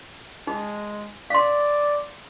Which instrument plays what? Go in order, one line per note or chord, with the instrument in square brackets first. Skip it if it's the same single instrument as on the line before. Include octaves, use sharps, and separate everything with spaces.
[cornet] G#3 [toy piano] D#4
[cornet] D5 [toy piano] F5 C6